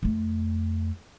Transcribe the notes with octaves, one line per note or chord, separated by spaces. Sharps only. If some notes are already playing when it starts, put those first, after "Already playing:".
F2 A3